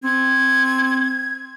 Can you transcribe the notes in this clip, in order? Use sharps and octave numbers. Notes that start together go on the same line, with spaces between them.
C4 G#6